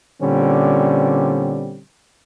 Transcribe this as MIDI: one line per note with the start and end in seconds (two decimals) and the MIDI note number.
0.22 1.81 46
0.22 1.81 50
0.22 1.81 55
0.22 1.81 60
0.22 1.81 61